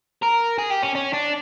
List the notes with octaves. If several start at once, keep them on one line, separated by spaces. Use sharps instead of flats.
A#4
G#4
G4
C#4
C#4
D4